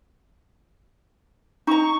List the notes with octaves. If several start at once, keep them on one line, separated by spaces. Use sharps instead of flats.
D#4 A#5 C#6